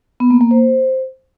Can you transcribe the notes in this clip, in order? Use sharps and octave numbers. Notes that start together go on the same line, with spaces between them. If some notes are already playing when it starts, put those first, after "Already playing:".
B3
A#3
A#3
C5